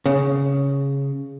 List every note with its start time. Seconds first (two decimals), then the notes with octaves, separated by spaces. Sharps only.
0.06 C#3